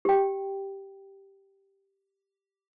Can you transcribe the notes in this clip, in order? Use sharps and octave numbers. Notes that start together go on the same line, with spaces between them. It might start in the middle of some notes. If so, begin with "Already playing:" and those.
G4 G5